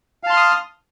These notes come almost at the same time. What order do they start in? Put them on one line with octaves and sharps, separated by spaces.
F5 A5 C6 F6 D#6